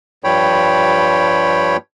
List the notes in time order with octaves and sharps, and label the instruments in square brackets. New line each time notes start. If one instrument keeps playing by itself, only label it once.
[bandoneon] G2 F3 G3 C#5 G5 B5